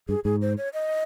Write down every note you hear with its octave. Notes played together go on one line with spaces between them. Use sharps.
G2 G#4
G#2 G#4
C5
C#5
D#5